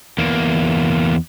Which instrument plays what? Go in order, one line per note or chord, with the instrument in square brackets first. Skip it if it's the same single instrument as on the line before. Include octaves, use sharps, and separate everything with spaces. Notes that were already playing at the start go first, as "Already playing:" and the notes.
[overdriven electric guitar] E2 A#3